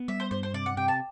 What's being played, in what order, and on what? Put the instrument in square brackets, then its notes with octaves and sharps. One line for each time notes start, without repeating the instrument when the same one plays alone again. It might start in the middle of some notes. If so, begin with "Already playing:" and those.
Already playing: [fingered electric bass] B3
[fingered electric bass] G3 [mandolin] E5
[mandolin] C5
[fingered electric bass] G2 [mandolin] C5
[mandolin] C5
[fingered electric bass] C3 [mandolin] D5
[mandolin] F#5
[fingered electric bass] C3 [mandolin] G5
[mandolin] A5